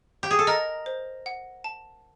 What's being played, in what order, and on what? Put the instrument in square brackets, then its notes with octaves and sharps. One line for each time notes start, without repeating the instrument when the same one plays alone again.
[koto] G4
G#4
A4
[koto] A#4 [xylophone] D#5
[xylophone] C5
F#5
A5